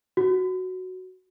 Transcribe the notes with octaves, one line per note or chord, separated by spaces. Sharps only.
F#4